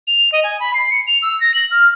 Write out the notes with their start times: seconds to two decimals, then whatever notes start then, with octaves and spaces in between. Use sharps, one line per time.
0.07 F7
0.32 D#5
0.43 G#5
0.60 B5
0.74 C7
0.91 C#7
1.07 F7
1.22 E6
1.40 A#6
1.54 F#7
1.71 F6